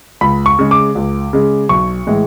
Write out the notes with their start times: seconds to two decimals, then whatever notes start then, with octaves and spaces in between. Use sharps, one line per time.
0.21 C#2 B5
0.46 C#6
0.59 C#3 G#3
0.71 D6
0.95 C#2
1.33 C#3 G#3
1.69 B1 C#6
2.07 A2 E3 G#3